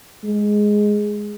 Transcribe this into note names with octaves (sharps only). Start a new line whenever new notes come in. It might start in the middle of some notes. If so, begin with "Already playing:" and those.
G#3